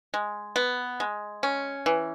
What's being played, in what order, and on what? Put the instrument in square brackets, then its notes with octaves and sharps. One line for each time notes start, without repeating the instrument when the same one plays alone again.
[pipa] G#3
B3
G#3
C#4
E3